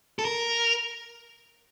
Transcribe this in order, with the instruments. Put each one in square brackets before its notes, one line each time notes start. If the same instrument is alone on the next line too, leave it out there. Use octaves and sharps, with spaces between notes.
[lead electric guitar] A4
A#4